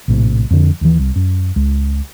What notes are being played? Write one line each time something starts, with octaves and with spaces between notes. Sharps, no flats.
A#1 A2 C3
F2 D3
D#2 E3
C2
F#2
C#2